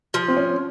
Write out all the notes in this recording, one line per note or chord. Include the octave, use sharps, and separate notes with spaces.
F3
C4
C#4